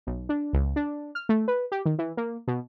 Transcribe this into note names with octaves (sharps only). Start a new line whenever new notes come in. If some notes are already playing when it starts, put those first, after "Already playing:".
B1
D4
C#2
D4
F6
A3
B4
G4
D#3
E3
A#3
B2